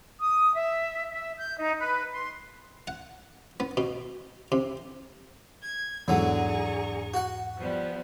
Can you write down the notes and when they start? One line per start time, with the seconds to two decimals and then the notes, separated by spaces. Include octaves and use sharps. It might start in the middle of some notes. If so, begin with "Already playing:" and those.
0.19 D#6
0.54 E5
1.11 E5
1.37 G6
1.57 D#4
1.80 B4
2.11 C6
2.87 F#5
3.60 B3
3.77 B2
4.52 C3
5.62 G#6
6.08 E2 G#2 D3 F#3 G#4 A#5 C#6
7.14 F#4 F#5
7.58 F3 G3 B3